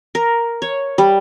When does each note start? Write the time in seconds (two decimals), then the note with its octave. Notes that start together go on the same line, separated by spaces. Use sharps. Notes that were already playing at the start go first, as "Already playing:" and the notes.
0.15 A#4
0.62 C#5
0.98 G3